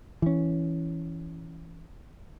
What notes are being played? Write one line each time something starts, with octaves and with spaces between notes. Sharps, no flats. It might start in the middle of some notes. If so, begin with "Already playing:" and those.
E3 C#4